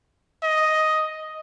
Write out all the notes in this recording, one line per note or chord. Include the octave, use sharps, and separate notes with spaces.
D#5